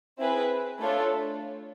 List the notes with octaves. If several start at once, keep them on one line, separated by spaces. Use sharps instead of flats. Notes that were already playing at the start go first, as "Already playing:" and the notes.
C4 E4 G#4 B4
A3 D4 F4 A4 C#5